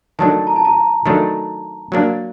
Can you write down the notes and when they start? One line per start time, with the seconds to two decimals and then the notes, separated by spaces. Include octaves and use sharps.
0.19 D#3 F#3 A3 D4 A5
0.47 A#5
0.56 A5
0.65 A#5
1.06 D#3 F#3 A3 D4
1.92 F#3 A#3 D4